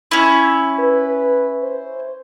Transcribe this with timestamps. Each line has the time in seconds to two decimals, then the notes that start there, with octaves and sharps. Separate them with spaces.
0.11 C#4 E4
0.79 B4
1.63 C5